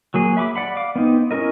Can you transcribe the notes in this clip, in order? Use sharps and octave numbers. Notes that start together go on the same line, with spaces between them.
F#3 A#3 G#4
E5 B5 C#6 D6
D5 F#5 B5
F5 D6
B3 C4 D#4
C#4 E4 A#4 D#5